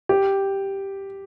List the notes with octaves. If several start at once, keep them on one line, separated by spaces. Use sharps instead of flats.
G4